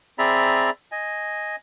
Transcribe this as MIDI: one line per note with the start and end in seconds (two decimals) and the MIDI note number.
0.19 0.70 60
0.19 0.70 68
0.19 0.70 74
0.19 0.70 76
0.19 0.70 82
0.19 0.70 83
0.92 1.56 75
0.92 1.56 80